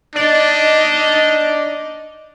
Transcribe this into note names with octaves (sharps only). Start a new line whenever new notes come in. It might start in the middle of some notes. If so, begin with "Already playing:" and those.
D4 D#4 D5 D#5